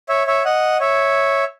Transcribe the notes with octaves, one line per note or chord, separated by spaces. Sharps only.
C#5 E5
C#5 E5
D#5 F#5
C#5 E5